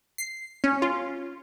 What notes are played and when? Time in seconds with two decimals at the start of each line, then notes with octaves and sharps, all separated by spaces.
0.18 C7
0.64 C#4
0.82 F4